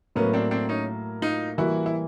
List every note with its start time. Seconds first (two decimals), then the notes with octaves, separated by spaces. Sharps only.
0.15 A2 F#3 A#3 B3 C#4
0.33 C4 D4
0.51 C4 D4
0.69 C#4 D#4
1.22 D#4 F4
1.58 E3 G3 A#3 E4 F#4
1.86 E4